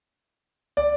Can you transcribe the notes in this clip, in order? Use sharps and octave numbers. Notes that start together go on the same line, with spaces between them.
D5